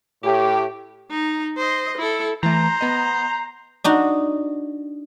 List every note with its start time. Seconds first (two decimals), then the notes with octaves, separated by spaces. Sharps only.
0.23 A2 G4
1.10 D#4
1.57 C5 D#5
1.98 E4 A4
2.43 E3 A3 C5 A#5
2.81 B3 D#5
3.84 D4 D#4 F#4